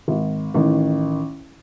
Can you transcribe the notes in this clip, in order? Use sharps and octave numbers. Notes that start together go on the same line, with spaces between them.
G#1
A1 D#3